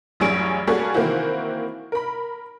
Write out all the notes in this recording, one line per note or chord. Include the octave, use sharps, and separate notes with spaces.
A1 F#2 G3 C#4 G#4 D7
G3 A#3 C#4 F#4 G#4 A4
D#3 E3 A#3 C4 E4 F#4
A#4 B5